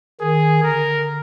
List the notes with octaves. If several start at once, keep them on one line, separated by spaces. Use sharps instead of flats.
D#3 G#4
D3 A#4